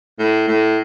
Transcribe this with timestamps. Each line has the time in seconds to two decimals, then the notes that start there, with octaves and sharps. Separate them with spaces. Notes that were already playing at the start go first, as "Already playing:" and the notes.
0.19 A2
0.48 A2